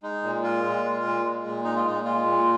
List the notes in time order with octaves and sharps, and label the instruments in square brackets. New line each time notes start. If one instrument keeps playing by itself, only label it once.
[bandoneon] G#3 D#4
A#2
G#3 F4
A#2
G#3
A#2
G#3
A#2
G#3 D#4
F4
A#2 D#4
G#3 F4
A#2